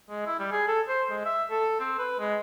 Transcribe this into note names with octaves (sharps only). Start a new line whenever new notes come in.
G#3
E4
G3
G#4
A4
C5
G#3
E5
A4
C4
B4
G#3